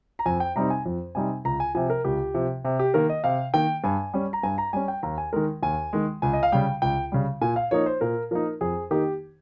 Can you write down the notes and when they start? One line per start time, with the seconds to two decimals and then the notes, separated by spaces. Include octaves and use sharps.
0.19 A#5
0.26 F2 G#5
0.40 G5
0.56 C3 G3 C4 D#4 A#5
0.70 G#5
0.86 F2
1.15 C3 G3 C4 D#4 G#5
1.45 C#2 A#5
1.60 G#5
1.75 C3 F3 G#5
1.90 A#4
2.05 C#2 G4
2.34 C3 F3
2.65 C3
2.79 G4
2.94 D#3 A#3 A#4
3.09 D#5
3.24 C3 F5
3.54 D#3 A#3 G5
3.84 G2 G#5
4.14 G3 C#4
4.33 A#5
4.43 G2 G#5
4.58 A#5
4.73 G3 C#4 G#5
4.88 G5
5.03 D#2 A#5
5.18 G#5
5.33 D#3 G#3 A#4
5.63 D#2 G#5
5.93 D#3 G#3
6.22 C#2 G#5
6.33 D#5
6.43 F5
6.52 C#3 G3 G5
6.82 C#2 G5
7.12 C#3 G3
7.41 A#2 G#5
7.56 F5
7.71 F3 A#3 D#4 C#5
7.86 C5
8.01 A#2 A#4
8.31 F3 A#3 D#4 A#4
8.61 F2 G#4
8.91 D#3 A#3 D#4 G4